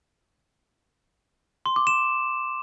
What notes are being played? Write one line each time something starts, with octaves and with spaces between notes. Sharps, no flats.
C6
D6
E7